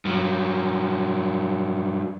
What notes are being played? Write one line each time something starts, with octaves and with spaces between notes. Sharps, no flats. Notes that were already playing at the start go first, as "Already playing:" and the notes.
G2 F#3